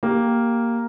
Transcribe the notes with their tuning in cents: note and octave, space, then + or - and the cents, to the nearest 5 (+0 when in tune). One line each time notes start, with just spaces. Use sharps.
A#3 +0 G4 +0